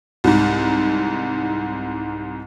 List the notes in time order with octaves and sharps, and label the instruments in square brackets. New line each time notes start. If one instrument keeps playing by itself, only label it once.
[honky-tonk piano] C2 G#2